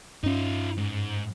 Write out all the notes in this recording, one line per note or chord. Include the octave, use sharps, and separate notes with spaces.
G2 C#4 D#4 F4
G#2